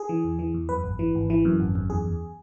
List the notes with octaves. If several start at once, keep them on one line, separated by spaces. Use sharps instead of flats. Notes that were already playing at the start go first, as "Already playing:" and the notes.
Already playing: G#4
E3
E2
E3
E2
F#2 B4
G#1
E3
G#1
E3
F#2
G#1
F#2
E2 G#4
E2